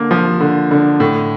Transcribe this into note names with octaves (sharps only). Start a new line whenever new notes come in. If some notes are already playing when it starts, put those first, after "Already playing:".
Already playing: D3 A#3
F3
D3
D3
A2